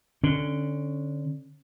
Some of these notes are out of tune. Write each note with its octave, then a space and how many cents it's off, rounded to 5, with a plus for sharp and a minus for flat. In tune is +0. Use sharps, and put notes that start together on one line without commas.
D3 +0 C#4 -20